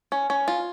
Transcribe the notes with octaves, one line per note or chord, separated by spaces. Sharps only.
C#4
C#4
F4